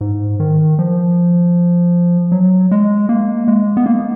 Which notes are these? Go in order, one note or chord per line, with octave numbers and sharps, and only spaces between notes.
G#2
D#3
F3
F#3
G#3
A#3
G#3
B3
A#3